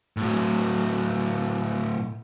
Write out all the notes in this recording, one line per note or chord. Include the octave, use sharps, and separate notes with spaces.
A2 F#3